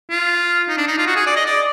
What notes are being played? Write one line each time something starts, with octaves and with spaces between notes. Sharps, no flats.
F4
D#4
D4
D#4
F4
F#4
G#4
D5
D#5
D5